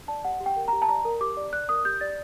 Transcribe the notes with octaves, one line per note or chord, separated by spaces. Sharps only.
D5 A5
G4 F#5
G4
G5
A#4
G4 A#5
A5
D5 A#5
A#4
G4 D6
D5
D5 F#6
A#4 D#6
G4 G6
D5 A6